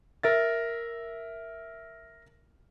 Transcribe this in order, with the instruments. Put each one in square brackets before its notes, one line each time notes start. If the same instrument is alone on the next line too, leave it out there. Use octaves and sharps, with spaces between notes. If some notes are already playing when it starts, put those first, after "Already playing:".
[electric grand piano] A#4 E5 A6